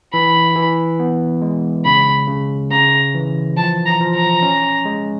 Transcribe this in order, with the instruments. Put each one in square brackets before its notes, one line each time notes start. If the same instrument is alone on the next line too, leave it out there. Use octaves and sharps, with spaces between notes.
[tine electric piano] E3 [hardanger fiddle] B5
[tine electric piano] E3
B3
G#3
[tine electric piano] C#3 [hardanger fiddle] B5
[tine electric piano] C#3
[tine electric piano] C#3 [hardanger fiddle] A#5
[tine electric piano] E3
[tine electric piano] F3 [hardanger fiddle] A5
[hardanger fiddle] A#5
[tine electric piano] F3
[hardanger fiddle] A#5
[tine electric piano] C#4
G#3